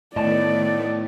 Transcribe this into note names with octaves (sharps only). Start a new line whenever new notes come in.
A2 D#3 A3 B3 D5 D#5 A5